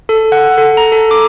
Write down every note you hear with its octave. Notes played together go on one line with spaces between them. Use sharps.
A4
F#5
A4
A#5
A4
D6